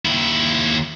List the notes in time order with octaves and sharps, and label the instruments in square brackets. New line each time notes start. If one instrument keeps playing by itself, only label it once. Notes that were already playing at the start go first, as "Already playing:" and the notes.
[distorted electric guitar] D#2 E4